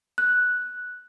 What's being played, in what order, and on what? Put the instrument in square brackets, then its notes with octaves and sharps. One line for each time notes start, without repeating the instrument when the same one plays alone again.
[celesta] F#6